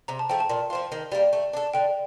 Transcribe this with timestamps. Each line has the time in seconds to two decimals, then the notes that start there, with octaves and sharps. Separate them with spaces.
0.08 C3 A#5
0.19 A5
0.29 F3 A3 G5
0.40 A5
0.49 A#2
0.70 F3 C4 F4
0.92 D#3
1.12 G3 A#3
1.33 A3
1.53 D4 A4
1.74 D3 G5